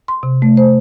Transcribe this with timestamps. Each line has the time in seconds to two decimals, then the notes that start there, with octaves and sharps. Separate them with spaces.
0.08 C6
0.23 C3
0.42 A3
0.57 C5